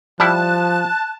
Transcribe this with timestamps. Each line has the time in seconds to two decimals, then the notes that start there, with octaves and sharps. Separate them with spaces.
0.20 F3 G3 E4 A5 F#6